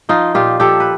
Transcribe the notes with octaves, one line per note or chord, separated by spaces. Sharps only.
F3 D#4 F4
A#2 F4 G4
F3 G4 A4
B4